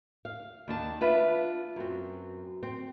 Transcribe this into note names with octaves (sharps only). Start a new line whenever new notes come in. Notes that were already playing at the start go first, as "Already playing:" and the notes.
F5
D#2 D4 A5
D4 F4 B4 E5
F#2 C4
C4